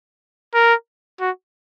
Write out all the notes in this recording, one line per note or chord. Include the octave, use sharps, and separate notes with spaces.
A#4
F#4